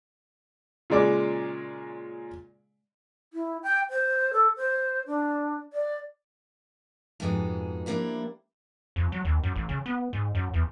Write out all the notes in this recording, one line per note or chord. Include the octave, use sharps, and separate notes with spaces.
A#2 C#3 G#3 D5 D6
E4
G5
C5
A4
C5
D4
D5
F2 G#2 B2 G#3 D#4
F3 G3 A#3 D4 E4
F2
F#3
D#2
F#2
A1
C#3
B3
G#2
F#2
E2